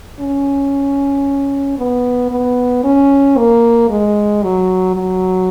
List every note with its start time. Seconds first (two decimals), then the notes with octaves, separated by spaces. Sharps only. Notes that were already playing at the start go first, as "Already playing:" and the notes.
0.20 C#4
1.78 B3
2.31 B3
2.84 C#4
3.37 A#3
3.90 G#3
4.43 F#3
4.95 F#3